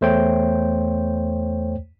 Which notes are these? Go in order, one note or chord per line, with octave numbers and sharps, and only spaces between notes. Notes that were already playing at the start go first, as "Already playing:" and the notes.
E2 A3 C5 C#5 G5